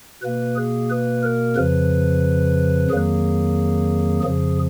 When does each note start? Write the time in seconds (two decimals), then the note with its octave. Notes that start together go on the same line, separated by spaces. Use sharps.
0.22 B2 A#3 B4
0.56 G#4
0.90 B4
1.23 A#4
1.56 F2 C#3 F3 B4
2.90 F2 D#3 F#3 A#3 G#4
4.24 F2 C#3 F3 G#4